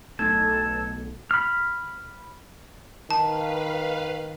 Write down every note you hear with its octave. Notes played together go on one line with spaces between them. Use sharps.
B1 A3 D#4 A4 G#6
B5 F6
D#3 B4 F5 A5